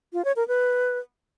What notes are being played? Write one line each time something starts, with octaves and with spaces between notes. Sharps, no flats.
F4
C#5
A#4
B4